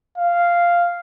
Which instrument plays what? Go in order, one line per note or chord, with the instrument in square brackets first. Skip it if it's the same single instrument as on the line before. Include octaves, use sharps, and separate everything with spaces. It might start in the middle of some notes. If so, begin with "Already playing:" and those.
[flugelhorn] F5